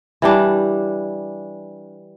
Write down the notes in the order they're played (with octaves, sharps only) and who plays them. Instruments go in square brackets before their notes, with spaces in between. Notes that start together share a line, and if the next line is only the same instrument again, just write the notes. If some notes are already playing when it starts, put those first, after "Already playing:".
[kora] E3 G3 D4